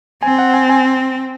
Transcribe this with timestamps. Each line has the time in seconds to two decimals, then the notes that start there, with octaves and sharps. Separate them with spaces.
0.23 C4 G#5
0.39 F#5
0.54 G#5
0.69 G#5